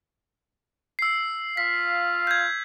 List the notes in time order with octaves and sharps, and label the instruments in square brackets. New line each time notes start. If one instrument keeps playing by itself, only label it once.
[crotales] E6 C7
[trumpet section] F4 F5 [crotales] B6
[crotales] G6 G#6